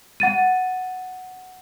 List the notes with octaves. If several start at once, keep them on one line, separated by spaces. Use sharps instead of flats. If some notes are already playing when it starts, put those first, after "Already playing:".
F#5 A6 D#7